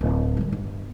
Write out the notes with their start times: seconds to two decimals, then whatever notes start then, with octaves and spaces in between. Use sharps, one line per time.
0.01 D1
0.37 D#3 G3
0.52 G1